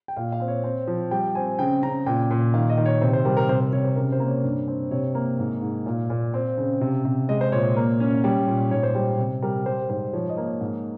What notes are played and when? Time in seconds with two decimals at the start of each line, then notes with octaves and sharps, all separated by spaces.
0.08 G5
0.16 A#2 F5
0.32 F5
0.40 C4
0.48 C#5
0.64 C4
0.87 F3
1.11 G3 G5
1.35 C4 G#5
1.59 C#3 G5
1.83 C#3 A#5
2.06 A#2 G5
2.31 A#2
2.54 D#3 F5
2.70 D#5
2.78 D#3
2.86 C#5
3.01 C3 C5
3.13 C5
3.25 G3 A#4
3.37 A#4
3.49 C3 C5
3.61 C5
3.73 C3 C#5
3.84 C5
3.96 C#3 A#4
4.12 C5
4.20 A#3
4.28 C#5
4.44 G2
4.68 C4
4.91 C3 C#5
5.15 A#3
5.39 G#2
5.62 G#2
5.86 A#2 F5
6.10 A#2
6.34 C4
6.58 C#3
6.81 C3
7.05 C3
7.29 G#3 D#5
7.41 C5
7.52 A#2 C#5
7.76 A#3
8.00 C#4
8.24 G3
8.47 A#2
8.71 G#2 C#5
8.83 C5
8.95 G3
9.18 C3
9.42 G3 A#4
9.66 G3 C5
9.90 G#2 C5
10.13 F3 C#5
10.29 D#5
10.37 A#3
10.45 C#5
10.61 G#2